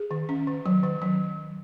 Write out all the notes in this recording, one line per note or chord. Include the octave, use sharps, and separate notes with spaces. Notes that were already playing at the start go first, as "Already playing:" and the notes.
Already playing: G#4
D#3
C#4
D#3
F#3
D#3
F#3